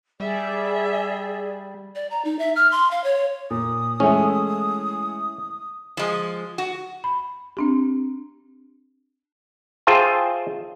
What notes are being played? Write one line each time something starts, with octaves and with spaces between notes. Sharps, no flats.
G3 G#4 D5 E5
D5
A#5
D#4
E5
F6
C6
F5
C#5
A#2 D#6
E3 G#3 A3 C#4
F3 G#3
F#4
B5
C4 D4 G4
F4 G#4 C5 E5 G5 A5